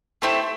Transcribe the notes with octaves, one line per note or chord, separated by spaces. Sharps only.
A3 C4 E4 G4